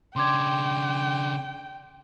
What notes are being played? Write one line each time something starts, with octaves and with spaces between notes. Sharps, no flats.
C#3 D4 G5 C6 D6 G#6